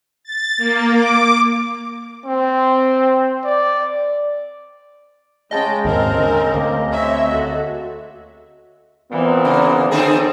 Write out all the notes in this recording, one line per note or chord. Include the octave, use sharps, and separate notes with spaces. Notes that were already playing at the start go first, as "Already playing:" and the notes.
A6
A#3
D6
C4
D5
C#3 G#3 D#5 G5 A5 B5
D#2 G#2 B2 C4 A#4
D3 G#4
D2 A#3
C4 C#5 E5
F#4 A4
A#2 E3 B3 C4
C#3
D3 C4 G#4 A4 C5 C#5